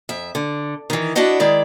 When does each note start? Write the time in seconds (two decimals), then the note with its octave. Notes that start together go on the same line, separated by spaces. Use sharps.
0.09 F2 E5
0.35 D3
0.90 D#3 E3
1.15 D4 E4 F#4 D5 D#5 F#5
1.40 D#3 G#3 E4 D5